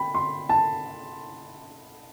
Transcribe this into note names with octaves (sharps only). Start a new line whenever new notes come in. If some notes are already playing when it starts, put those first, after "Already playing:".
Already playing: G5 B5
C6
A5